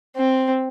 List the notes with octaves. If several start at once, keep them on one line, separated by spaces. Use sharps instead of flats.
C4